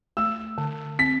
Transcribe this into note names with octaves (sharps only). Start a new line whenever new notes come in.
A3 E6
D3
C4 B6